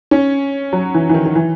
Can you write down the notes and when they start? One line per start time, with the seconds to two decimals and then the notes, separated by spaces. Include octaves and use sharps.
0.11 C#4
0.73 F#3
0.94 E3
1.09 E3
1.14 D#3
1.25 D#3
1.35 E3